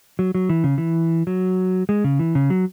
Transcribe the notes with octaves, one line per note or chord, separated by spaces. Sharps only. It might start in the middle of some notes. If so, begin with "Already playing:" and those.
F#3
F#3
E3
C#3
E3
F#3
G#3
C#3
E3
C#3
F#3